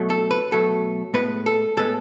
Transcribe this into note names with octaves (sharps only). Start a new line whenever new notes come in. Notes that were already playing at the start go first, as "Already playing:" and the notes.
Already playing: B2 F#3 A3
A4
B4
B2 F#3 A3 A4
A2 G#3 B3 B4
A4
A2 G#3 B3 A4